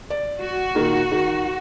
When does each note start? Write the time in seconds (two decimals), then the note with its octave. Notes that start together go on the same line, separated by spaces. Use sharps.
0.10 D5
0.39 F#4
0.75 A#2 D#3
1.12 D#3